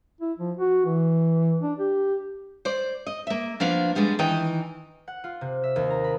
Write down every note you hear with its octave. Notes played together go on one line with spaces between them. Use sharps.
E4
F3
F#4
E3
D4
G4
C5 D5
D#5
A#3 E5
F3 A#3 B3 D4 F5
G3 G#3 B3 D4
D#3 E3 D#5 G5
F#5
F4
C3
E5
D#2
A#5
B5